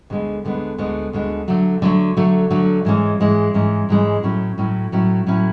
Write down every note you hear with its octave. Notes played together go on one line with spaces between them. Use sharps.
D2 D3 G#3 B3
D2 D3 G#3 B3
D2 D3 G#3 B3
D2 D3 G#3 B3
D3 F#3 A3
D3 F#3 A3
D3 F#3 A3
D3 F#3 A3
G#2 E3 G#3 C#4
G#2 E3 G#3 C#4
G#2 E3 G#3 C#4
G#2 E3 G#3 C#4
A2 F#3 C#4 E4
A2 F#3 C#4 E4
A2 F#3 C#4 E4
A2 F#3 C#4 E4